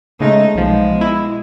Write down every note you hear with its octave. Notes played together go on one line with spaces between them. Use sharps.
C#3 G#3 A3 D#4
B1 B2 F3 G#3
E4